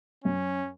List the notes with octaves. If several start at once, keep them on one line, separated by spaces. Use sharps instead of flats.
F#2 C#4